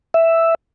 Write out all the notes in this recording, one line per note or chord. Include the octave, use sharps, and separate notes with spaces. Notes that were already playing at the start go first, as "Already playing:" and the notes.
E5